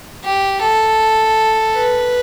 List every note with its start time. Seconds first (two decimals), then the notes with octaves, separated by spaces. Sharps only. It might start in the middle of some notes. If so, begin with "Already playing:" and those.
0.24 G4
0.61 A4
1.75 B4